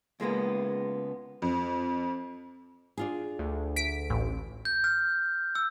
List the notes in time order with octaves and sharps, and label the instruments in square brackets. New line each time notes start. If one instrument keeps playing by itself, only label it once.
[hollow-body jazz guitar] C#2 G#3 A#3 B3
[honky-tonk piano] F2
[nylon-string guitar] D4 F4 G#4
[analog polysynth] D2
[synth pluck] B6 D7
A1
[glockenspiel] G6
F6
E6